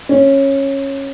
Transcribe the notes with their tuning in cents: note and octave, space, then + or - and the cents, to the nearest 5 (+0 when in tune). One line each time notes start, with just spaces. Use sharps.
C#4 -15